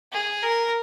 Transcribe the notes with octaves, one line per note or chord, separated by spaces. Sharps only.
G#4
A#4